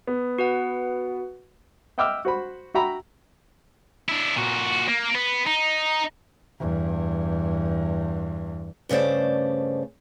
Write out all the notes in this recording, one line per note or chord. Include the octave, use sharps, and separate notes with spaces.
B3
F#4 B4 F#5
D#5 E5 G5 D6 E6 F6
F#4 C5 B5
F#4 E5 G5 A#5 B5
D4 E4
A#2 F#4
A#3
B3
D#4
E2 G2
G2 C#3 A3 C5 D5